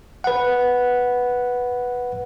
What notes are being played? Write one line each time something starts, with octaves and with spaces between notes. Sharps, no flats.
B4 F#5